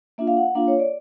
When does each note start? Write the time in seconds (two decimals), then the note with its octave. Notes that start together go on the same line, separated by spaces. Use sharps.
0.18 A#3 D4 F4 E5
0.27 F5
0.37 F#5
0.55 A#3 D4 F4 F5
0.68 C#5
0.79 D5